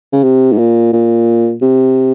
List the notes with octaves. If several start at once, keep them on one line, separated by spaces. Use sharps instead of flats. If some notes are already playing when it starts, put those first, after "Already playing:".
C#3
C3
G#2
A#2
A#2
C3